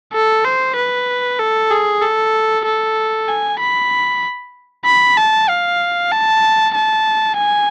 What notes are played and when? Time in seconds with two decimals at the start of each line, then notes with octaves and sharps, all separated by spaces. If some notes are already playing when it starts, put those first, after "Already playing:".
0.13 A4
0.44 C5
0.76 B4
1.39 A4
1.71 G#4
2.02 A4
2.65 A4
3.28 G#5
3.60 B5
4.85 B5
5.17 A5
5.49 F5
6.12 A5
6.75 A5
7.38 G#5